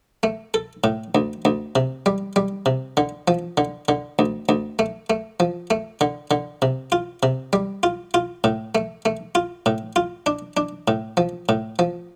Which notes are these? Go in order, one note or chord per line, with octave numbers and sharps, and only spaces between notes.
A3
A4
A2
D2
D2
C3
G3
G3
C3
D3
F3
D3
D3
D2
D2
A3
A3
F3
A3
D3
D3
C3
F4
C3
G3
F4
F4
A2
A3
A3
F4
A2
F4
D4
D4
A2
F3
A2
F3